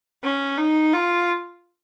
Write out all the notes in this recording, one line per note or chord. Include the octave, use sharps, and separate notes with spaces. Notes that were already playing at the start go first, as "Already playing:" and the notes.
C#4
D#4
F4